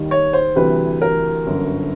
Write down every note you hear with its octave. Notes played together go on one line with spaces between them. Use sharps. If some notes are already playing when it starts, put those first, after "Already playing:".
Already playing: D#2 D#3 G3
C#5
C5
D2 C3 E3 G3 B4
A#4
G1 F#2 D3